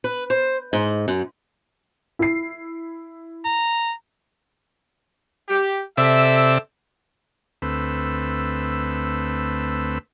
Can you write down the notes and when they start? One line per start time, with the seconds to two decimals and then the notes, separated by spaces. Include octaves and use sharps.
0.04 B4
0.30 C5
0.73 G#2
1.08 F#2
2.19 E4 C7
3.45 A#5
5.49 G4
5.98 C3 A4 D5 E5 E6
7.62 D2 A3 C4 B4 E6